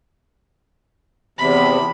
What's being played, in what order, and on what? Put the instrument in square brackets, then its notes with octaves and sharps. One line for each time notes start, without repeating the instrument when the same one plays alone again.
[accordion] E2 C3 [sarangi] B5